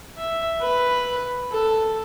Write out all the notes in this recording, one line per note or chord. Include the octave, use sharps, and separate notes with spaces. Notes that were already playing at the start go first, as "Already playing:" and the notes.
E5
B4
A4